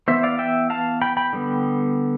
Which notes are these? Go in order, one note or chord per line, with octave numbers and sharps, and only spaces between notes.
E3 B3 C5 E5
D5 F5
E5 G5
F5 A5
G5 B5
G5 B5
D3 G3 B3